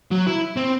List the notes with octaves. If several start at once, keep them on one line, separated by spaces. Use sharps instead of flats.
F#3
E4
C4